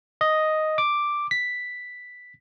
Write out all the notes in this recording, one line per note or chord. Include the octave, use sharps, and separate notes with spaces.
D#5
D6
B6